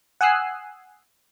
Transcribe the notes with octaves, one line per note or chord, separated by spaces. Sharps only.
F#5 G#5 D#6 E6 F#6 C7